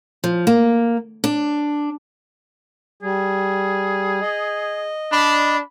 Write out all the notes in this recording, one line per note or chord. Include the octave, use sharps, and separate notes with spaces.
F3
A#3
D4
G3 G#4
D#5
D4 B5